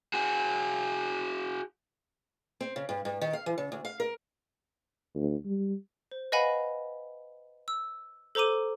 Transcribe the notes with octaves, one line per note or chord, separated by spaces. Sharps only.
F#4 G#4
C4
C#3
G2
G2
D#3
F5
E3
C#3
D2
F5
A#4
D2
G3
C5
B4 D#5 F5 F#5 G#5 B5
E6
A4 C5 A#5 D6 D#7